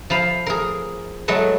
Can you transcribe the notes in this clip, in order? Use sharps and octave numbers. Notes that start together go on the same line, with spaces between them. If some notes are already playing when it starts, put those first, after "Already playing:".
F3 F5 B5
G#4 A#4
F#3 G#3 A3 B4